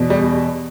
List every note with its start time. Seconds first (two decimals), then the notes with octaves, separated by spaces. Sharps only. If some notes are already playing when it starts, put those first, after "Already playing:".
Already playing: E2 B2
0.10 G3